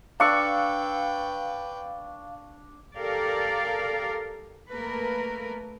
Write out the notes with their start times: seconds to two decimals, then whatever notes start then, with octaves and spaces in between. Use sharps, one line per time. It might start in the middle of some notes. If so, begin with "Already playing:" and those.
0.20 D4 B4 F5 G5 C#6 E6
2.97 G4 A4 A#4 D5 F5
4.71 A3 A#3 A#4 B4